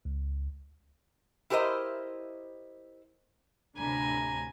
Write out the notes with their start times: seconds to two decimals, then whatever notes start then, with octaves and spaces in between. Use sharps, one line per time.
0.05 C#2
1.50 E4 G4 A#4 C5 D#5
3.77 D2 A2 C3 D4 G#5 A#5 B5